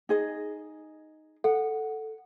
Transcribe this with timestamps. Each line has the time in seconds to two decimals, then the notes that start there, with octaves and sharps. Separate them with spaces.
0.09 D#4 G#4 D#5
1.44 A4 F#5